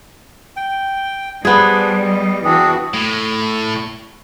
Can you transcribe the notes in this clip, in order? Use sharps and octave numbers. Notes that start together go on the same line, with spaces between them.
G5
G3 B3 D4 G#4 C5 G#5
D#5
E3 C4 D4 F#4 G#4
A2